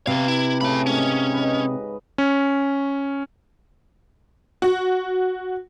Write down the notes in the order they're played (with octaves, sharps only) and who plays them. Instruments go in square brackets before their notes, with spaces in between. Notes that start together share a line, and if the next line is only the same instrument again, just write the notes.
[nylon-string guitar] C3 [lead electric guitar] B3 F5 [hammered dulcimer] B4
[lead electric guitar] E4
[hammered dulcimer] A2 C#3 A3 [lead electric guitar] A4 B5
[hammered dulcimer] G#2 [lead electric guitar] C#4
[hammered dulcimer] B4 D#5
[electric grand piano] C#4
[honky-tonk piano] F#4